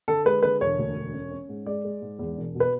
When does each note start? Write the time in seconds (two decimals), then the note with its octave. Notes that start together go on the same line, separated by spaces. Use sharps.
0.08 D3 A4
0.25 G#3 B4
0.42 D3 B4
0.61 E1 C#5
0.78 D2
0.96 E1
1.13 C#4
1.31 C#4
1.49 G#2
1.66 G#3 D5
1.84 G#3
2.02 G#2
2.19 E2
2.37 E1
2.55 B2
2.60 B4